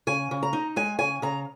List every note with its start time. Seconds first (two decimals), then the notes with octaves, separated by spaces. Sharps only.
0.07 C#3 G#5
0.31 C#3
0.43 A#5
0.53 D#4
0.76 G#3 G#5
0.99 C#3 G#5
1.22 C#3 A#5